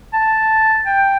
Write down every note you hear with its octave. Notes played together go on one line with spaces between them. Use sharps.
A5
G5